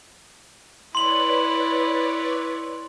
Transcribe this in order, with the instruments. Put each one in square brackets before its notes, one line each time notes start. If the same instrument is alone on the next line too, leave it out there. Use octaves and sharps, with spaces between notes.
[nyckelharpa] E4 [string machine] B4 C#5 D5 [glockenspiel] C6 F#7